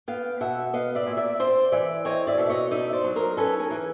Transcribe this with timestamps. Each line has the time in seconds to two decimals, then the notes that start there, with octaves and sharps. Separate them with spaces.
0.08 B3 F5 G5
0.41 B2 E5 F#5
0.73 B3 D#5 F5
0.95 D5 E5
1.07 A#2
1.17 D5 E5
1.40 C4 C5 D5
1.72 E3 D5 E5
2.05 C4 C#5 D#5
2.27 D5 E5
2.38 B2 E5
2.49 C#5 D#5
2.71 D#4 D5 E5
2.93 C5 D5
3.04 F#3
3.16 A#4 C5
3.37 C#4 A4 B4
3.60 G#4 A#4
3.71 E3